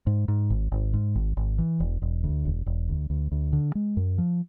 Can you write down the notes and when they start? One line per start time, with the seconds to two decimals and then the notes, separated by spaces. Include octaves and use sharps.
0.07 G#2
0.28 G#2
0.50 G#1
0.72 G#1
0.94 G#2
1.15 G#1
1.37 G#1
1.58 E3
1.80 E1
2.02 E1
2.24 D2
2.45 E1
2.66 E1
2.89 D2
3.10 D2
3.32 D2
3.53 D3
3.75 G#3
3.97 F#2
4.18 F3